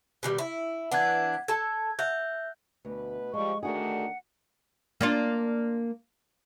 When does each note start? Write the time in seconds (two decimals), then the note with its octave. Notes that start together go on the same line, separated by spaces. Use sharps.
0.23 B2 D#3 G3
0.38 E4
0.92 E3 B3 D4 F#5 G#6
1.48 A4 A5 G#6
1.99 E5 F#5 G6
2.85 D2 B2 B4
3.33 F3 G3 G#3 C#6
3.63 D3 D#3 A3 D4 F#4 G#4 F#5
5.01 A#3 D4 F4